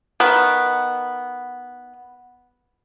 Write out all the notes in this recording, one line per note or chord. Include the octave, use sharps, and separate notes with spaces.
D#3 B3